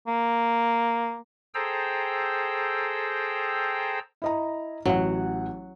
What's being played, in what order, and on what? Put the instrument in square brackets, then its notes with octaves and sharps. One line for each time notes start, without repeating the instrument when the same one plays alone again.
[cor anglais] A#3
[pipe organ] G#4 A4 C5 G5 A#5 E6
[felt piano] E4 D#5 A#5
[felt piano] A1 F#5 [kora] F#3